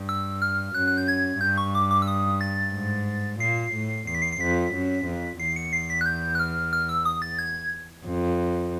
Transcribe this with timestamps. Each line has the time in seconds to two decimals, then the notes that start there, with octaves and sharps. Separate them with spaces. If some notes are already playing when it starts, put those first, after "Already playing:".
Already playing: G2
0.09 E6
0.42 F6
0.75 F#2 F#6
0.88 F#6
0.98 G6
1.08 G#6
1.41 G2 G6
1.58 C#6
1.75 D6
1.91 D6
2.02 E6
2.08 D#6
2.41 A6
2.73 G#2
3.40 A#2 C7
3.73 A2
4.07 E2 C7
4.15 B6
4.22 C7
4.32 C7
4.40 F2 B6
4.74 F#2
5.06 F2
5.40 E2 C7
5.56 C#7
5.73 C7
5.90 B6
6.01 F#6
6.06 G6
6.35 F#6
6.39 F6
6.73 F6
6.89 E6
7.05 D#6
7.22 A6
7.39 G#6
8.06 F2